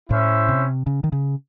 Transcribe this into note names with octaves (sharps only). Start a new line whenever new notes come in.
A2 C#4 E4 C5 E5
C3
C#3
D#3
C#3